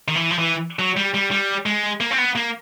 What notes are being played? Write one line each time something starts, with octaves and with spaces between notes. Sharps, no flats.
D#3
E3
F3
E3
F#3
G3
G3
G3
G#3
A#3
C4
B3
A#3